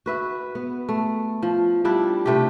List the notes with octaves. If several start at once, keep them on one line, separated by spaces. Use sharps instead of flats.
F#4 B4 E5
B3
A3
F3
F3 G3 D4 E4
C3 A3 E4 G4